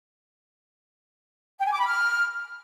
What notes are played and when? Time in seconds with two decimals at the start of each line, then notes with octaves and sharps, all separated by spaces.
1.59 G5
1.66 G#5
1.72 D6
1.79 B5
1.86 F6